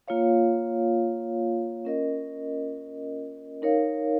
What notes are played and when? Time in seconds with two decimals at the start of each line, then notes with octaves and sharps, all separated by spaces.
0.08 A#3 F4 C#5 F5
1.85 C#4 A#4 D#5
3.62 D#4 A#4 C#5 F5